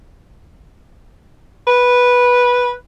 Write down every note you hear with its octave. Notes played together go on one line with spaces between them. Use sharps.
B4